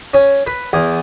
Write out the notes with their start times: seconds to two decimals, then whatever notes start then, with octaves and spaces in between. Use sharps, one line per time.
0.14 C#4
0.47 B4
0.73 E2